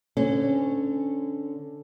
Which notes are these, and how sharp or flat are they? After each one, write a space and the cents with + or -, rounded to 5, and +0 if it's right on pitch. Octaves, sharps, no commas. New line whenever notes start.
D3 +0 C#4 -10 C5 -40